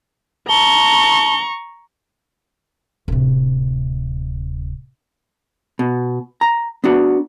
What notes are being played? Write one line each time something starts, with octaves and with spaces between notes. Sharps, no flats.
A5 A#5 C#6 G7
D1 C3
B2
A#5
B3 D4 F#4